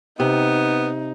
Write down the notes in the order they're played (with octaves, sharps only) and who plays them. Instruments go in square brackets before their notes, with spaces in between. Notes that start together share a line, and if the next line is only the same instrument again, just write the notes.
[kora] C3 [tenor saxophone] B3 [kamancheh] D#4